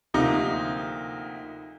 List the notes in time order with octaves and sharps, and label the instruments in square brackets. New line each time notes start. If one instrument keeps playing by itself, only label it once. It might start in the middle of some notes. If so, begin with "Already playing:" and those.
[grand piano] D2 C3 F3 A#3 D#4